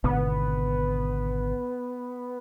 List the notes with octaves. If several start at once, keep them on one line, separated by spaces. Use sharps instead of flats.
G#1 B2 D3 B3